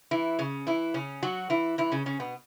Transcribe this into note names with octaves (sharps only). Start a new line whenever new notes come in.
E3 E4
C#3 C#4
E3 E4
C#3 C#4
F#3 F#4
E3 E4
E3 E4
C#3 C#4
C#3 C#4
B2 B3